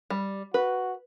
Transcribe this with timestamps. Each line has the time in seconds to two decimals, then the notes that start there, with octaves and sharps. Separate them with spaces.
0.10 G3
0.54 F#4 B4